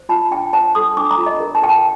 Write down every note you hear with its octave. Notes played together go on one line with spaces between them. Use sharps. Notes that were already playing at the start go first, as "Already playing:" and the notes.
Already playing: C5
F4 A5
D4 G5
C5 A5
A4 D#6
D4 D6
A#5
F4
D#5
A#4
A5
A#4 G5
A5